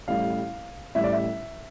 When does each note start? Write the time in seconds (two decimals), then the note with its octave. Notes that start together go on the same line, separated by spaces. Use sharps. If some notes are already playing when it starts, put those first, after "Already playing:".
0.08 A1 A2 G3 F5
0.95 A1 A2 G3 E5
1.04 D5
1.12 E5